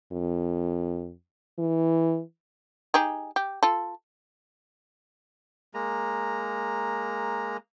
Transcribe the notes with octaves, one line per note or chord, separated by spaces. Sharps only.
F2
E3
D#4 G4 G#4
G4
F4 A4
G#3 A#3 A#5